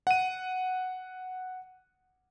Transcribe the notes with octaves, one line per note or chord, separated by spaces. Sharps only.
F#5 D#7